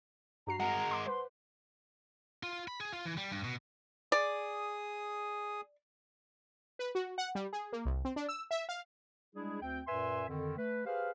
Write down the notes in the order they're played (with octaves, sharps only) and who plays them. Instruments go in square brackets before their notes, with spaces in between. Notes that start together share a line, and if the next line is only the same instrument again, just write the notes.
[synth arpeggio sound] G2 F#4 C7 [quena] A#5
[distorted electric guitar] G#3 A#4 [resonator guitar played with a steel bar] F#5 [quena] A#5
[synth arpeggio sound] C6 D6
[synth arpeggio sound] B4 C5 [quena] C6
[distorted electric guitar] F4
B5
G#4
F4
E3
G3
G2
B2
[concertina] G#4 D#6 [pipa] D5
[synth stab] B4
F#4
F#5
G3
G#4
A#3
C2
C4
D4
E6
E5
F5
[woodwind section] G3 G#3 D4 E4 G#4
D2 C4 G5
F#2 A#2 B4 E5 G#5 C6
F2 D3 D#3
A3 B4
G4 G#4 B4 C5 F5